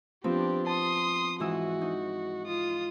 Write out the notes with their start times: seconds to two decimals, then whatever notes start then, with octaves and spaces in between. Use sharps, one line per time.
0.24 F3 B3 C4 D4 G4
0.66 A5 C6 D#6
1.40 G#2 E3 F#4 E6
1.81 D#4
2.47 F4 D#6